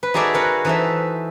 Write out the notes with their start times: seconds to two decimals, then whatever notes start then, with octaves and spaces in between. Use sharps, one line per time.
0.03 B4
0.14 D#4 F#4 G#4 A4 D5 E5
0.34 A#4 B4 F#5
0.65 E3 D#4 A4 C5 E5